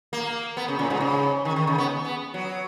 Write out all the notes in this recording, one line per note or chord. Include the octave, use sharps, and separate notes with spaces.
A#3
B3
C#3
A#2
G#2
C#3
D#3
D#3
C#3
B3
B3
F#3